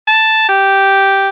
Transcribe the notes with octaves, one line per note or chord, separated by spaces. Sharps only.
A5
G4